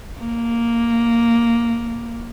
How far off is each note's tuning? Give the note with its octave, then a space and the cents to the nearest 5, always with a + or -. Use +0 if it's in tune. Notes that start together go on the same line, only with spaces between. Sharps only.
A#3 +0